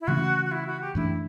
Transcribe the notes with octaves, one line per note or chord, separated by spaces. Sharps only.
E4
C#3 E3 A3 C#4 F#4
F#4
E4
F#4
G4
F#2 E3 A3 D4 E4